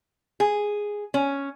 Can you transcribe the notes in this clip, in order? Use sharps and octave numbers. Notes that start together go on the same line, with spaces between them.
G#4
C#4